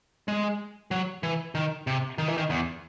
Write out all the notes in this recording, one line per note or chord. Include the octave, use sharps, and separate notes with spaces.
G#3
F#3
E3
D#3
C3
D#3
E3
D#3
E2